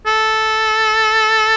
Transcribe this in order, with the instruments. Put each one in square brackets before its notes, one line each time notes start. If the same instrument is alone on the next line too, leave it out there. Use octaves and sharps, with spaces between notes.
[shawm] A4